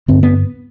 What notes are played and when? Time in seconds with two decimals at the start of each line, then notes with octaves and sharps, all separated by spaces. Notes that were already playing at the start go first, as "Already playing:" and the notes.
0.08 G2 D3 C4
0.23 B3